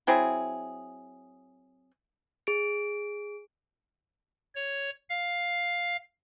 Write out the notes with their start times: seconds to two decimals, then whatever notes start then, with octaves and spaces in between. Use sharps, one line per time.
0.07 F#3 C4 E4 G#4
2.47 G#4 D7
4.55 C#5
5.09 F5